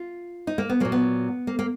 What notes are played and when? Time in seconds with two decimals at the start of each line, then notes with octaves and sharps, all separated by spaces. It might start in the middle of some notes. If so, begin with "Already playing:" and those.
Already playing: F4
0.47 D#4
0.58 A#3
0.69 B3
0.80 A#2 F#3 A#3
0.92 B3
1.47 A#3
1.59 A#3